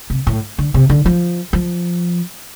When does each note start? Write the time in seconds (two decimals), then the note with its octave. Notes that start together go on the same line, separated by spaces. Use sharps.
0.10 C3
0.27 A2
0.58 D3
0.74 C3
0.89 D3
1.06 F3
1.53 F3